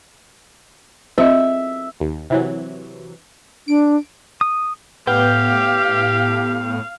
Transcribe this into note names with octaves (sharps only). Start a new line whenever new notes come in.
C4 F4 D#5 E5
D#2
C3 E3 F#3
D4 D7
D#6
A2 B3 G4 F5 G5 G6